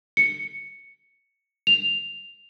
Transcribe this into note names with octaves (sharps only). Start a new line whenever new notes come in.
C#7
F7